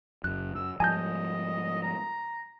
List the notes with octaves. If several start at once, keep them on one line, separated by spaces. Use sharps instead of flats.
F#1 F#2 F#6
F#2 E6
G#2 F3 G3 D#5 G#5 A5 G6
A#5